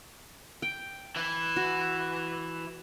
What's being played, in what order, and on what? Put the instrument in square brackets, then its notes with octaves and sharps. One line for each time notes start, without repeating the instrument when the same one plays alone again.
[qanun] G5
[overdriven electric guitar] E3 E4
[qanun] F#4